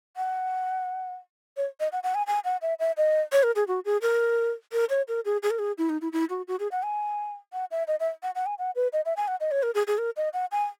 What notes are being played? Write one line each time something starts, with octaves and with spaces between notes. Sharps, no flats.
F#5
C#5
D#5
F#5
F#5
G#5
G#5
F#5
E5
E5
D#5
C#5
A#4
G#4
F#4
G#4
A#4
A#4
C#5
A#4
G#4
G#4
A#4
G#4
E4
D#4
E4
E4
F#4
F#4
G#4
F#5
G#5
F#5
E5
D#5
E5
F#5
F#5
G#5
F#5
B4
D#5
E5
G#5
F#5
D#5
C#5
A#4
G#4
G#4
A#4
D#5
F#5
G#5